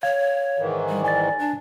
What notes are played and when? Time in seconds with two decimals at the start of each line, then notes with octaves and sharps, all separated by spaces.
0.03 C#5 F5 G#6
0.59 G#2 D#3 E3
0.89 G3
1.04 D5 G#5 A6
1.39 D4